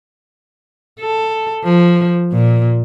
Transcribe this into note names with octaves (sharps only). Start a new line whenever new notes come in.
A4
F3
A#2